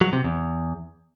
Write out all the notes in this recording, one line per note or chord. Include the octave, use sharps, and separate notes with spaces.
F#3
C3
E2